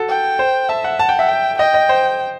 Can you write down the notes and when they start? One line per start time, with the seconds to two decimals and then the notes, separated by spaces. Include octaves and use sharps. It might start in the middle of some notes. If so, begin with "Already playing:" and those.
Already playing: F#4 A4
0.09 G5
0.39 C5
0.69 E5 A5
0.84 F#5
0.99 F#5 A5
1.09 G5
1.19 E5
1.29 G5
1.59 D#5 G5
1.74 D#5
1.89 C5